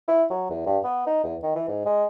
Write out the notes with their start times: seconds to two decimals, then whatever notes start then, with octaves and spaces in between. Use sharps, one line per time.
0.08 E4
0.30 F#3
0.50 E2
0.66 G2
0.84 B3
1.06 D#4
1.24 E2
1.43 D#3
1.55 E3
1.68 G#2
1.85 G#3